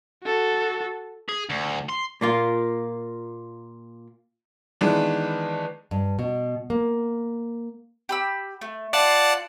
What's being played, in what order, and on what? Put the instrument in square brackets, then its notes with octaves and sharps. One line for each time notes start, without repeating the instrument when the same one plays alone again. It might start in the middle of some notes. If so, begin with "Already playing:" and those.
[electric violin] F#4 A4
[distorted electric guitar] G#4
D2
C6
[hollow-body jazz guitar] A#2 A#3 F4
[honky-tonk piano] D#3 E3 G#3 B3 D4 B4
[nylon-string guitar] G2
B2
A#3
[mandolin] G4 B5 E6
A3
[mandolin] F4 [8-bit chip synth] D5 F#5 A5